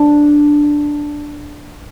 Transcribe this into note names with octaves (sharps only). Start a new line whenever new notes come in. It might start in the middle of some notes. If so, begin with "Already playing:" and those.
Already playing: D4